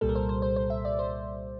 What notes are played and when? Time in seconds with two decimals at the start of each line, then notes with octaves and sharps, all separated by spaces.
0.01 C2 A#2 G3 A4
0.09 A#4
0.15 C5
0.29 C5
0.42 C5
0.56 C5
0.70 E5
0.85 D5
0.99 C5